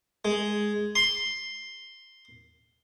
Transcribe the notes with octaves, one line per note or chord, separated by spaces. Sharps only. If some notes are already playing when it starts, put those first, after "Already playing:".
G#3
C6